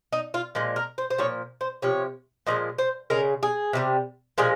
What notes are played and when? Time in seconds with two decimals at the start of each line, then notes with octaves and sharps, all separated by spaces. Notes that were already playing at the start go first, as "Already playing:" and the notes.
0.13 D#4
0.34 F4
0.55 A#2 F3 G#3
0.76 A#4
0.98 C5
1.10 C5
1.18 A#2 F3 C#5
1.61 C5
1.82 C3 F3 C#5
2.47 A#2 F3 G#3 D#5
2.78 C5
3.10 C#3 G#3 A#4
3.43 G#4
3.73 C3 D#3 G3
4.38 A#2 F3 G#3 G#4